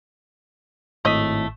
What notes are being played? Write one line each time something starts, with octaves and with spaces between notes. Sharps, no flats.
G#1 A2 A3 D#5 B6